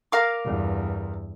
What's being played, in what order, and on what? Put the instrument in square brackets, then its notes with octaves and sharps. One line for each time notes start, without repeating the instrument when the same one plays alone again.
[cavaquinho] A#4 F5 D6
[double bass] E2 G2